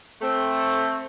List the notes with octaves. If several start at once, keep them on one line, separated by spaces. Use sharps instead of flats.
A3 C4